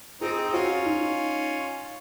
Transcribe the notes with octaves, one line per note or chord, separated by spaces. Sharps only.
C4 D#4 G#4
D#4
C#4 F4 F#4
D#4